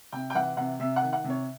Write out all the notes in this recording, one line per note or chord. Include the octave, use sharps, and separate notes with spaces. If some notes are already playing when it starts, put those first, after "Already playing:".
C3 G5
G5
E3 F#5
C3 F#5
C3 E5
F#5
D#3
F#5
C3
C#5